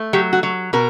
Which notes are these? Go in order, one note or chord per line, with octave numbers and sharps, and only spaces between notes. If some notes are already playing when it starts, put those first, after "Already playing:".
Already playing: A3
F#3 G4
F#4
F#3
B2 A#4